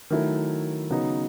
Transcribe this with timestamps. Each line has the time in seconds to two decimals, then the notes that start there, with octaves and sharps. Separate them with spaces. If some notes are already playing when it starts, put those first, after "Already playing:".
0.10 D#3 F#3 A3 E4
0.90 C#3 F#3 B3 D#4 G#4